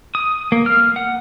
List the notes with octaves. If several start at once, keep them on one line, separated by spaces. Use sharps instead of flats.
D#6
A#3
F6
F#5